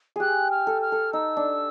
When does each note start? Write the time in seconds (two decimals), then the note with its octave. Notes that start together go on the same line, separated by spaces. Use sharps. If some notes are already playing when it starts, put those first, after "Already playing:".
0.16 G4 G#4 F#6
0.51 F6
0.67 A4
0.82 F6
0.92 A4
1.13 D#4 E6
1.37 D4